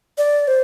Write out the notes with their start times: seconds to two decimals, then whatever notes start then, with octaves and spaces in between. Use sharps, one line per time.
0.18 D5
0.48 C5